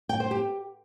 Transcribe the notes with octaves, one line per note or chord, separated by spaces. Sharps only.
G5
C5
G4